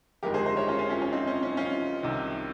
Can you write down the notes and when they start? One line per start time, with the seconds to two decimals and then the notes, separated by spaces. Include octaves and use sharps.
0.23 G1 F2 D#3 G#3 G4 A#4
0.34 G#4 C5
0.46 C5 D#5
0.57 A#4 C#5
0.68 C#4 F4
0.79 C#4 F4
0.90 C#4 F4
1.01 C#4 F4
1.12 C4 D#4
1.27 C#4
1.43 C#4
1.57 C#4 F4
2.03 C2 C3 D#3